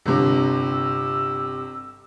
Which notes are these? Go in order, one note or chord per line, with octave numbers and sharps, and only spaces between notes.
G1 C3 E6